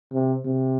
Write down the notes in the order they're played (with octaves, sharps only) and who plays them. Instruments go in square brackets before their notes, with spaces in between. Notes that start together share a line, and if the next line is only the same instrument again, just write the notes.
[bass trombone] C3
C3